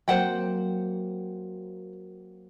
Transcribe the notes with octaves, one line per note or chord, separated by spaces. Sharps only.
F#3 A#3 C4 C5 F#5 G5